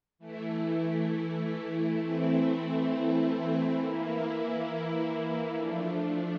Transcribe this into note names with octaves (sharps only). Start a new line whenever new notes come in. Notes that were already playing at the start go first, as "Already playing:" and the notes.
E3 A3 E4
E3 A3 C4 E4
E3 A#3 E4
F3 A3 D4